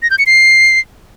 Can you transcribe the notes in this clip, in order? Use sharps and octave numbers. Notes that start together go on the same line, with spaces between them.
A#6
G6
C#7
C7